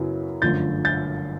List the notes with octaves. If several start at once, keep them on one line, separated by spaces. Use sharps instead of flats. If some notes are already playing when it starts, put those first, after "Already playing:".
Already playing: F#2 C#3 F#3 B3 E4
G1 F#2 D3 F3 A3 G6 A6
G6 A6